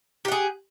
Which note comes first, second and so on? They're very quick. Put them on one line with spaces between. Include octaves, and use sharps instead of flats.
G4 F#5 G#4